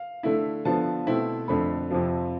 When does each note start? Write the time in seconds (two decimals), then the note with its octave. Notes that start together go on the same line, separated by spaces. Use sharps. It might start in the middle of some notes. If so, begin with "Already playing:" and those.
Already playing: F5
0.23 D3 A3 E4
0.65 D3 F3 B3 A5
1.07 B2 A3 C4 E4
1.48 F2 D3 A3 B5
1.90 F2 C3 F3